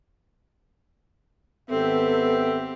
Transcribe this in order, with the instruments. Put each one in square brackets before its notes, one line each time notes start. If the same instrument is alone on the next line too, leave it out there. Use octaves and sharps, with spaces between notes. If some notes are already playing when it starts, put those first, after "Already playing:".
[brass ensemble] G#1 B3 [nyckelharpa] C4 G4 [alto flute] A4 [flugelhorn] E5